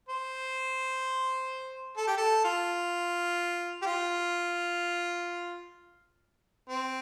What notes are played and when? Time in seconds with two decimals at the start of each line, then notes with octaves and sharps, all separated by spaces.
0.09 C5
1.97 A4
2.07 G4
2.17 A4
2.45 F4
3.82 G4
3.86 F4
6.69 C4